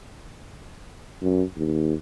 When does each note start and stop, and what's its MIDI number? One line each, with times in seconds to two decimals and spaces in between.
1.22 1.43 42
1.56 1.94 39